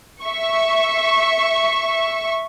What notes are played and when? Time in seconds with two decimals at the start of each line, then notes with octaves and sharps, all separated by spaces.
0.24 E5 C#6